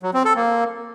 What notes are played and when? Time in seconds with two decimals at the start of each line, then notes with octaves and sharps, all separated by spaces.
0.03 F#3
0.14 C4
0.25 A4
0.36 A#3